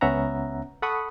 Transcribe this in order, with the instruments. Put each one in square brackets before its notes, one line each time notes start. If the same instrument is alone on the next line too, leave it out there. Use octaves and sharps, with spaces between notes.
[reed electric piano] C#2 B3 C#4 E5 F#5 A#5
A4 F#5 B5 C#6 D#6